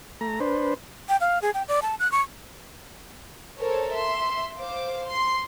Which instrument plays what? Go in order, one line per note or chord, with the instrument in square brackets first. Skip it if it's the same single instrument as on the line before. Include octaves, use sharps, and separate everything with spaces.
[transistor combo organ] A3 A#5
D4 B4 C5
[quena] G5
F5
G#4
G5
D5
A5
F#6
C#6
[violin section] A4 A#4 C5 C#5
E5 C6
C5 F5 D6
C6